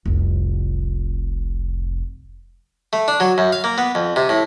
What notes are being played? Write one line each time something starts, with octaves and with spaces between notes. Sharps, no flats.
F1 C2
A3
D4
F#3
F#2
F5
A#3
B3
F2
C3
A2